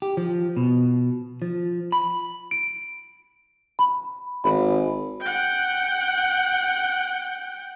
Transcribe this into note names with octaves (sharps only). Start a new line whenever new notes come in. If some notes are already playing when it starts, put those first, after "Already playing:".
G4
F3
B2
F3
B5
D7
B5
G#1 B5
F#5 G5